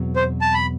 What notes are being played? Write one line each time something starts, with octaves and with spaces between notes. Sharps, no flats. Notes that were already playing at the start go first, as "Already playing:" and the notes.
Already playing: E2 B2 F#3 C4
C5
A5
B5